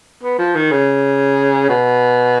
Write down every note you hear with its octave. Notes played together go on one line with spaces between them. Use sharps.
B3
F3
D#3
C#3
B2